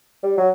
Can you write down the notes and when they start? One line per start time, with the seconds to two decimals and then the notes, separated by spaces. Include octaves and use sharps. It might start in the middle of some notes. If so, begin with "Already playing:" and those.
0.23 G3
0.38 F#3